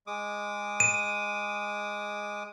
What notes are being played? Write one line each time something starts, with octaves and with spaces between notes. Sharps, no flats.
G#3 D6 D#6
D#7